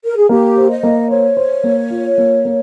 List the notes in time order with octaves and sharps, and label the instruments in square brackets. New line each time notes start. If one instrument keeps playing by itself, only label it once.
[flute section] A#4
G#4
[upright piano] A#3 [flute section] G4
[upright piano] C5
[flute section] D#5
[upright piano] A#3
[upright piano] C5 [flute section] C#5
[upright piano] C5
A#3
F4
A#3
A#3